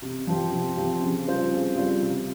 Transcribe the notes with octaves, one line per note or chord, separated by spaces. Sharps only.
C3
F3 C4 G4
C3
F3 C4 G4
C#3
G3 C4 F4 C5
C#3
G3 C4 F4 C5
C3